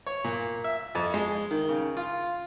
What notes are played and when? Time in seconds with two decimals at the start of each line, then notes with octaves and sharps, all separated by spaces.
0.07 C#5
0.24 A#2
0.64 E5
0.95 F2
1.14 G#3
1.51 D#3
1.69 C#3
1.97 F4